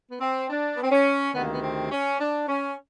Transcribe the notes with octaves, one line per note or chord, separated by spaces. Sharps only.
B3
C4
D4
B3
C4
C#4
D2 C3 D#3 B3
A#3
B3
C4
C#4
D4
C#4